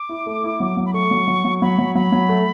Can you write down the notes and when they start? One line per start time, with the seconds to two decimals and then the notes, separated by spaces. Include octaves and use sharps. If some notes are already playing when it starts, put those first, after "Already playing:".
Already playing: D6
0.09 E4
0.26 A3
0.44 E4
0.60 F#3
0.77 F#3
0.86 B5
0.94 A3 C#6
1.11 F#3
1.28 F#3
1.45 F#3
1.62 F#3 B5
1.78 F#3
1.95 F#3 B5
2.12 F#3
2.29 A3